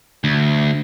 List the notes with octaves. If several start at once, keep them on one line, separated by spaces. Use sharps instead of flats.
D2